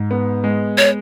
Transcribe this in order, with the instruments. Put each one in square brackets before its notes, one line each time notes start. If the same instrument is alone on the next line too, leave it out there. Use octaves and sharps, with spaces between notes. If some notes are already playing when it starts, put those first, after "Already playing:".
Already playing: [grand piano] G#2
B3
G#3
[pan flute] C#5